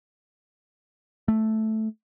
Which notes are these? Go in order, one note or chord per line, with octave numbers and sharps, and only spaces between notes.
A3